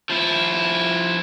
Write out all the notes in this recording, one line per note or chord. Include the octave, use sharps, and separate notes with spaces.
F3 E4